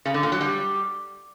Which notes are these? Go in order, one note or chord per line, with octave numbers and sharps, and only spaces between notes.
C#3
D3
A#2
F#3
G3